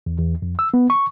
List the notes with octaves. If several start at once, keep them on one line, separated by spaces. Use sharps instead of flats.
E2
E2
F2
E6
B3
C#6